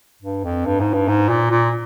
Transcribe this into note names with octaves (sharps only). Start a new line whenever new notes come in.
G2
F2
G2
G#2
G2
G#2
A#2
A#2